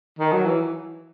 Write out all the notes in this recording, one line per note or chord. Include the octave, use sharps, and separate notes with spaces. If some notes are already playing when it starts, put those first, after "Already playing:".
D#3
F#3
E3